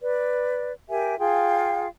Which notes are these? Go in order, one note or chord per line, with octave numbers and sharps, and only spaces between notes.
B4 D5
G4 A#4 E5 G#5
F4 G#4 F5 G5